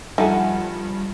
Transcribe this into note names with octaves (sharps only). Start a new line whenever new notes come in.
G2 F3 D#4 G4 A4 E5 F#5 G#5